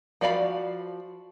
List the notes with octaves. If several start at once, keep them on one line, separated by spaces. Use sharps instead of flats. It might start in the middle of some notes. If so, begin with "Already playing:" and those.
F3 F#4 D5 F5 B5